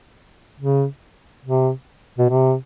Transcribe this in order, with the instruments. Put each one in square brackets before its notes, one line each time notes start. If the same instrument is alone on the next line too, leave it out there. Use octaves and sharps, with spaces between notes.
[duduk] C#3
C3
B2
C3